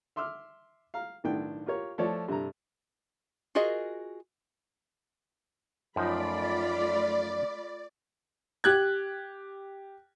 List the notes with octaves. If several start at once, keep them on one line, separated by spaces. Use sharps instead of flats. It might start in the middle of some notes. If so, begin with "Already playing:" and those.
E5 C6 D6 E6 F6
F5 A#5
B1 A2 D#3 D4 E4 G5
F4 G4 A#4 C#5
F3 A3 A4 C#5 D5
G2 C3 A4 A#5
F4 F#4 G#4 A#4 D#5
F#2 F3 A3 D#4 F4 D5 B5
G4 F#6 G#6